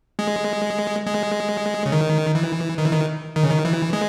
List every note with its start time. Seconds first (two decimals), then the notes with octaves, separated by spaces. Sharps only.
0.19 G#3
1.06 G#3
1.86 C#3
1.92 D#3
2.35 E3
2.78 D#3
2.86 E3
2.92 D#3
3.36 D#3
3.43 C#3
3.50 D#3
3.65 E3
3.93 G#3